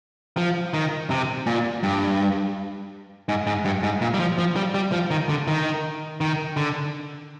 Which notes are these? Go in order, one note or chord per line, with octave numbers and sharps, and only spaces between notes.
F3
D#3
C3
A#2
G2
G#2
G#2
G2
G#2
A#2
G3
F3
F3
G3
G3
F3
D#3
D3
D#3
D#3
D3